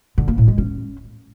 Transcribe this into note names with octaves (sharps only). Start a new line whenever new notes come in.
D3
A#3
A2
G#3
C#4